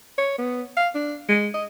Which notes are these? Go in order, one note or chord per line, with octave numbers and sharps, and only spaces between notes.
C#5
B3
F5
D4
G#3
D#5